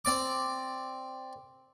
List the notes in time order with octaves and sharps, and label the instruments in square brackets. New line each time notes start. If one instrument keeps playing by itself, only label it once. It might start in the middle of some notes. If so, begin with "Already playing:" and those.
[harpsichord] C4 D5 D6